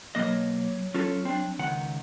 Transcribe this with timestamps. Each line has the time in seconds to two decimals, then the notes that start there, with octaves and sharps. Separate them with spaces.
0.15 B2 F#3 A#3 D#5
0.94 C#4 F4 A4
1.25 C4 D4
1.59 C#2 D#3 F#5